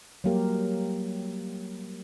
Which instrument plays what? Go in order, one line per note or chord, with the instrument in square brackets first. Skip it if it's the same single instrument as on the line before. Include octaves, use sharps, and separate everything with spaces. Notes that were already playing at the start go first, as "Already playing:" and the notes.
[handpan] F#3 G3 A#3 G4 A#4